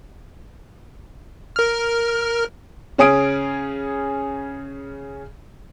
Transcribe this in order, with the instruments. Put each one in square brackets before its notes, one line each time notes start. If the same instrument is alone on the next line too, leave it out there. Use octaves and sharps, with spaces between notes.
[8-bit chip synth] A#4 F6
[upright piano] C#3 C#4 G#4 D#6 D7